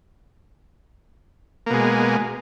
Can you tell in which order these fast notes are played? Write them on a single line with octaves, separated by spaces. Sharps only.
A#3 B2 G#3